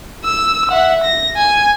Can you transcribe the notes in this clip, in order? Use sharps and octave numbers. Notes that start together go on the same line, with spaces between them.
E6
E5 F#5
A#6
G#5